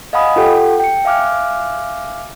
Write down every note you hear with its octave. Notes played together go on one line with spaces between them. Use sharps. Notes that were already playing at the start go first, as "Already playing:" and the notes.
D#5 F5 F#5 G#5 B5 D#6
F4 G4 A4 F#5 G5
G5 C#7
E5 F5 G#5 D6 F6 F#6